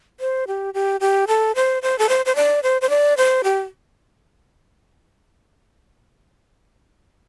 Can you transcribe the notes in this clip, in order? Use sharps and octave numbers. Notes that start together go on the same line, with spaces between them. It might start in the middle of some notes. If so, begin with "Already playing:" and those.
C5
G4
G4
G4
A4
C5
C5
A4
C5
C5
D5
C5
C5
D5
C5
G4